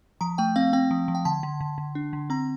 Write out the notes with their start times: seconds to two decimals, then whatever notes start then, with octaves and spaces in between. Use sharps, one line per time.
0.21 F3 A#5
0.38 A3 G5
0.56 C4 F5
0.73 C4 G5
0.91 F3
1.08 F3
1.15 G5
1.25 D3 A5
1.43 D3
1.61 D3
1.78 D3
1.95 D4
2.13 D3
2.30 C4 A#5